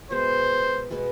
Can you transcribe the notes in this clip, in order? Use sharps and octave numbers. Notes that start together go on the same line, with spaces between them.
B2 G#3 B3 C5
B2 G#3 B3